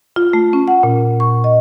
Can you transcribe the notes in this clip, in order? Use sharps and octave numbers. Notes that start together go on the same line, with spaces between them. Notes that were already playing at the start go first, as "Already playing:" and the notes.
F4
A3
C#4
F#5
A#2
C#6
D#5